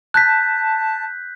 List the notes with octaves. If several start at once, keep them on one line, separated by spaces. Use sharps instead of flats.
A5 F#6 G6 B6